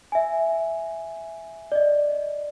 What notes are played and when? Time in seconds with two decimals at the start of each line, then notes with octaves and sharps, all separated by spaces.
0.12 E5 G#5
1.72 D5 D#5